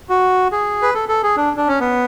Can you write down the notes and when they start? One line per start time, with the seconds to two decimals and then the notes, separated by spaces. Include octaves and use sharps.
0.09 F#4
0.52 G#4
0.82 B4
0.94 A4
1.09 A4
1.23 G#4
1.37 D4
1.57 D4
1.68 C#4
1.80 B3